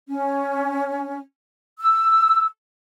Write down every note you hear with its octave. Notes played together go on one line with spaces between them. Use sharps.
C#4
E6